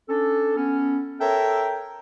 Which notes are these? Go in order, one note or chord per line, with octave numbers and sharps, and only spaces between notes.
C#4 D4 A4
B3 C#4
A4 A#4 C#5 E5 G5